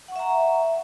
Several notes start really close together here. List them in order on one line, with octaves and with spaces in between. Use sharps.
F#5 C#6 E5 A#5